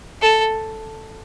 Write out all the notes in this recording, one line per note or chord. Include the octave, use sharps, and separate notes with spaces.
A4